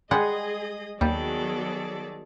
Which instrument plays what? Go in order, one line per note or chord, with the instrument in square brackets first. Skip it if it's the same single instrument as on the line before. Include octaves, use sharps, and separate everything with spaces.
[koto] G3 G#3 F#5 [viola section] G#4 [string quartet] D#5
[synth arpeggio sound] D#2 [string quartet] D#3 A4 D5 [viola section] F#3 B3 G#4 [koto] G3